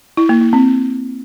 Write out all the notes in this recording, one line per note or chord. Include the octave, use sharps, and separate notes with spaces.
E4
A#3
E4
C4